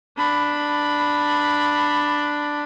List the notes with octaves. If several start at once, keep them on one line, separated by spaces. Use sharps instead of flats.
D4 B5